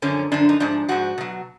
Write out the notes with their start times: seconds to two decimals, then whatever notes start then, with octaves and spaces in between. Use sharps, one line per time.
0.02 F#2 D3 F3 C#4
0.32 F#2 D3 F3 D4
0.49 D#4
0.60 G#2 F3 D4
0.88 G#2 F3 F#4
1.18 B2 F#3